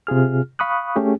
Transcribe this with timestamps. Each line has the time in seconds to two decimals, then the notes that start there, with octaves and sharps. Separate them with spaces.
0.07 C3 F4 G#4 F6
0.59 F5 B5 C#6 D#6 F#6
0.96 A3 C#4 G4 G#4